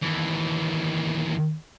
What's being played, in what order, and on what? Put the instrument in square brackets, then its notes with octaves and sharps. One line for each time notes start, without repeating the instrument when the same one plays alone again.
[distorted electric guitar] D#2 E3